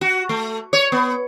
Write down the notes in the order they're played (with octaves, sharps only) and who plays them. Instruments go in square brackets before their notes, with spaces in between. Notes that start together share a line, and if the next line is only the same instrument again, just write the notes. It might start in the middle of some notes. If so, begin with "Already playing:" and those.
[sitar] F#4
A3
C#5
B3